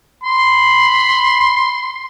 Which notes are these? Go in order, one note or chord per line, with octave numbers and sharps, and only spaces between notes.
B5 C6